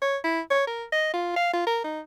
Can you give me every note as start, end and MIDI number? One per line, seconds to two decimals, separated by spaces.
0.02 0.17 73
0.24 0.40 64
0.50 0.67 73
0.67 0.84 70
0.92 1.09 75
1.13 1.35 65
1.36 1.53 77
1.53 1.63 65
1.67 1.79 70
1.84 2.00 63